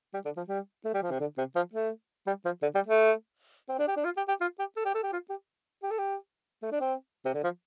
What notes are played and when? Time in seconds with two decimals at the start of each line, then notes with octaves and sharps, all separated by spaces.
0.14 G3
0.25 D3
0.37 F3
0.48 G3
0.85 A3
0.94 G3
1.03 F3
1.11 C3
1.20 D3
1.38 C3
1.56 F3
1.73 A3
2.27 G3
2.45 F3
2.62 D3
2.75 G3
2.87 A3
3.69 C4
3.79 D4
3.88 G4
3.97 D4
4.05 F4
4.17 G4
4.28 G4
4.41 F4
4.59 G4
4.77 A4
4.85 G4
4.95 A4
5.03 G4
5.12 F4
5.30 G4
5.83 G4
5.91 A4
5.98 G4
6.63 A3
6.72 D4
6.81 C4
7.25 C3
7.34 D3
7.44 F3